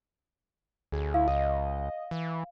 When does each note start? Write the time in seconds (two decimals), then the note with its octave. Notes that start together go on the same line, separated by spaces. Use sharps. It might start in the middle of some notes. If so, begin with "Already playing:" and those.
0.92 D2 G#4
1.14 E4 F5
1.28 C#2 D#5
2.11 E3